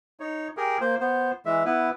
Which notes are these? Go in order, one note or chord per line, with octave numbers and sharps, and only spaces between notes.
D#4 C#5
G4 G#4 A#4
A#3 C5
B3 C5
E3 G#3 E5
B3 E4 B4